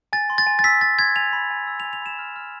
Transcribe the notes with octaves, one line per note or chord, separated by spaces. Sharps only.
G#5 A6
C6
A6
G#5
A6
E6 B6
G#5 A6
C6 G#6
G#5 F7
B5
G#5
E6
F7
G#5
F7
B5 E7
F6
F6